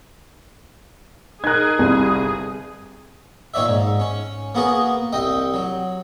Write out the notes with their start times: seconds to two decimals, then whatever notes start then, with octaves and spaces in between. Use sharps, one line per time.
1.44 D#4 G#4 A#4 F#6 G#6
1.79 G1 C2
3.54 A#2 D#3 C#5 D5 E5
3.68 G#2
4.00 C#4
4.55 A#3 B3 F#4 G#4
5.13 C2 D#5 G5
5.54 F#3